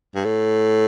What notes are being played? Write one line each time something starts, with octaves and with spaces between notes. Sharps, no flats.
G2
A2